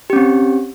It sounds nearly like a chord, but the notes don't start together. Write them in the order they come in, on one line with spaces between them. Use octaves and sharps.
G4 C#4 C4